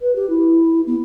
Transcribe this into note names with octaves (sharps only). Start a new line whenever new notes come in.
B4
G4
E4
B3